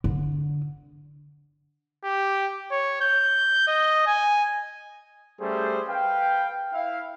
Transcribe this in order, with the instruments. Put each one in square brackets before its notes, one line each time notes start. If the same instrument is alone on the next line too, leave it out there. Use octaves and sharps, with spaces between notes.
[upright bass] D3
[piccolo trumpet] G4
C#5
G6
D#5
G#5
[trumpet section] G3 A3 C#4 G#4 C5
B4 F5 G5
E4 F5